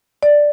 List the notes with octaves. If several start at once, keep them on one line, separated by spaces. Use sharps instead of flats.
D5